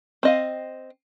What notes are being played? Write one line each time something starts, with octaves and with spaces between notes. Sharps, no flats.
C4 D#5 F5